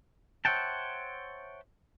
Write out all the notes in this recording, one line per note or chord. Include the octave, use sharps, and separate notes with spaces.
C5 C#5 E5 F#5 G5 A5